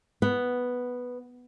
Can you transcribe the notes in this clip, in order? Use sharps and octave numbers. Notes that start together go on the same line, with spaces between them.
B3